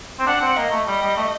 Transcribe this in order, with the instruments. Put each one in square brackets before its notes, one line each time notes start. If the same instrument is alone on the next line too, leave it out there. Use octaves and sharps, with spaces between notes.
[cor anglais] C4
[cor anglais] D4 [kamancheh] F#5
[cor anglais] C4
[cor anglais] A#3 [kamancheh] D#5
[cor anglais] A3
[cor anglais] G3 [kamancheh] D#5
[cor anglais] G3
A3